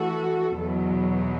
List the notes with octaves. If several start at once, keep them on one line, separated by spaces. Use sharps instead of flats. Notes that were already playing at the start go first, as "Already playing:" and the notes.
Already playing: E3 A3 F#4 A4
E2 B2 F#3